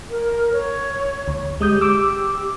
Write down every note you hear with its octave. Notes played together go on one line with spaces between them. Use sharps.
A#4
C#5
D2
G#3 G4 D#6 G6
D6 E6